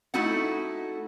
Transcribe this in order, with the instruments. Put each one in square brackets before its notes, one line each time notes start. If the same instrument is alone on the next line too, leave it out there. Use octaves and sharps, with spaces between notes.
[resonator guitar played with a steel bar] A3 D#4 E4 F#4 A4 F#5